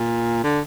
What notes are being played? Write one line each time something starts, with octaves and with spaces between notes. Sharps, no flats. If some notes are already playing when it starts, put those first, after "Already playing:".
Already playing: A#2
D3